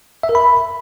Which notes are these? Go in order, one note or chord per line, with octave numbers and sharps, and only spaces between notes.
E5
A#4
B5